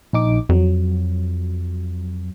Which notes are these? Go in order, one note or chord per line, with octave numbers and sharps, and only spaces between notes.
A#1 D#4 D6
F2 F#3